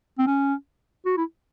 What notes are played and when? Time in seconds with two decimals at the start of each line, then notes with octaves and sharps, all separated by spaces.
0.19 C4
0.27 C#4
1.06 F#4
1.17 E4